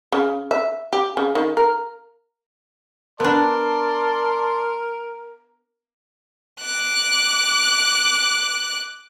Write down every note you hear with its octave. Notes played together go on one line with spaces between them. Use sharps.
C#3
E5
G4
C#3
D#3
A#4
B3 D4 A#4 D5 A5 C6
D6 F#6